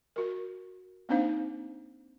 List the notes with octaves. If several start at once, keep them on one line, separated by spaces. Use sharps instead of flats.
F#4 A#4
A#3 C4 D4 D#4 C5 F5